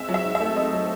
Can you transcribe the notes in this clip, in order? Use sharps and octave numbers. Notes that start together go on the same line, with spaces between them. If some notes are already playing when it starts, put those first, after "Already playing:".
Already playing: G#3 C4 E5
F#3
E5
G#2
E5
A3
C4 D#5
F#3